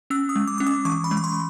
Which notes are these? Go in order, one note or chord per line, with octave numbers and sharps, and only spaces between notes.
C#4 E6
D#6
G#3
D6
C#4 D6
D#6
E3 C#6
B5
G#3
C#6
C6